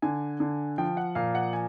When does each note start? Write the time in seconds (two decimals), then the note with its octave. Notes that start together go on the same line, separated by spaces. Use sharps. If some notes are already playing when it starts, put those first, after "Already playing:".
0.02 D3 G#5
0.40 D3
0.78 F3 G5
0.97 F#5
1.15 A#2 F5
1.35 F#5
1.53 G#5